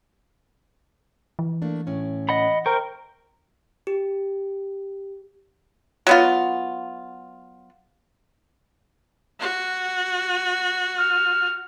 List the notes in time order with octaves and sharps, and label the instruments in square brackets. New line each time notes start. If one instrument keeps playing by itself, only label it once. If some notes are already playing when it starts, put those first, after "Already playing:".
[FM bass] E3
[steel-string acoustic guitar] A3 A#3 D4
A2 C#4
[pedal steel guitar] D#5 F#5 B5
[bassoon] A#4 [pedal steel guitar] C5 G5 C#6
[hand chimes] G4
[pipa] F#3 B3 F4
[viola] F#4
[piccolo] F6